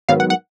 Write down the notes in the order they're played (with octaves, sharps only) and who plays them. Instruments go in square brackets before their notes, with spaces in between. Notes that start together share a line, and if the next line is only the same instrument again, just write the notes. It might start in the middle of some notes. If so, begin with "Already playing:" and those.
[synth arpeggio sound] G#2 D#3 F#3 B3 F5
F#5
F#5